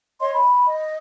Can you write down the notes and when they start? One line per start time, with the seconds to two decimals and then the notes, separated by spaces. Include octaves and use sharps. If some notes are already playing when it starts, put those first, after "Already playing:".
0.20 C#5 D#5 C6
0.34 B5
0.68 D#5